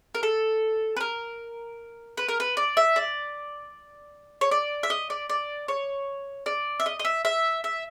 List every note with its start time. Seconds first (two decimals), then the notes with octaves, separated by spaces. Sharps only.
0.15 A#4
0.23 A4
0.97 B4
1.00 A#4
2.17 B4
2.28 A#4
2.40 B4
2.57 D5
2.77 E5
2.96 D5
4.41 C#5
4.51 D5
4.83 E5
4.90 D#5
5.10 D5
5.30 D5
5.68 C#5
6.46 D5
6.80 E5
6.86 D#5
6.99 D#5
7.05 E5
7.25 E5
7.64 E5